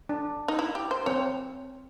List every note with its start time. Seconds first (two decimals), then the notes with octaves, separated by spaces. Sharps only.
0.09 D4
0.48 D#4
0.59 E4
0.75 G4
0.91 C5
1.06 C4 C#5